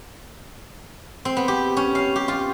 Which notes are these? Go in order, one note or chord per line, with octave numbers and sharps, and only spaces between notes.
C4
B3
G4
C#4
F5
G4
F4